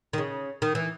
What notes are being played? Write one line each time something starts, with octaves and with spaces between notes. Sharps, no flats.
D#3
C#3
D#3
E3